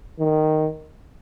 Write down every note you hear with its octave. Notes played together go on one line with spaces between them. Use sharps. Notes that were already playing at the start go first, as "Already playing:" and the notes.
D#3